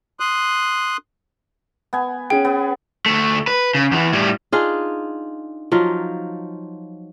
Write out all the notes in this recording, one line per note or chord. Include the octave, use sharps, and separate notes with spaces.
C6 D#6 F#6
B3 G#5
C#4 G#4 G5
B3
D2 A3
B4
C#3
E2 E3
A2 G3
D4 D#4 F4 G#4
F3 F#3 D#4 F4